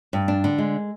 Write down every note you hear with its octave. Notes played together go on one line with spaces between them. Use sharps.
G2
D4
D3
G#3